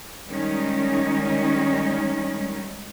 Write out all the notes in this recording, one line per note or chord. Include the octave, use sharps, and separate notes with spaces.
D#3 G3 G#3 C#4 D#4